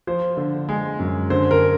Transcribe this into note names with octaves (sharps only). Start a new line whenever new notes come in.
F3 C5
D3
G#3
F#2
D3 C5
A#4